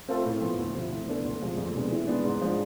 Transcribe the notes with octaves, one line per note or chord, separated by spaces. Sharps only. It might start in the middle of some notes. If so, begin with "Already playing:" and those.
A3 C4 F4 A4
A2
F3 B3
D2
C3 F3 A3 E4
E3
B3 D4 A4
D2
C3 F3 G#3
F2
C3 G#3 B3 D4
E3
G#3 B3 D4
G#2
F3 G#3 D4